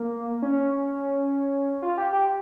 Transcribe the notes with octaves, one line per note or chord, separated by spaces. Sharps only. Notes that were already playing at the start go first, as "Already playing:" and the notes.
Already playing: A#3
C#4
F4
G4
G4